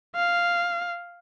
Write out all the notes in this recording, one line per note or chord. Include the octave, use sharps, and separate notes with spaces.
F5